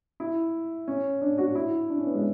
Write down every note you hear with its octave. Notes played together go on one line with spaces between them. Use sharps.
E4
C#4
D4
F#4
E4
D4
C#4
B3
G#3